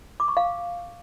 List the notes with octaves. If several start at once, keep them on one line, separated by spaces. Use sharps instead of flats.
D6
C#6
F5